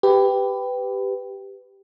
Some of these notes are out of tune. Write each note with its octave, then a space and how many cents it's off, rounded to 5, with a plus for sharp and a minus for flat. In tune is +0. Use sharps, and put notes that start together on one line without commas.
G4 +0 B4 +15